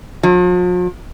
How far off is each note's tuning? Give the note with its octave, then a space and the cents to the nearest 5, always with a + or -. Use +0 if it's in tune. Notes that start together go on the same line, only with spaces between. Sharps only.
F3 +45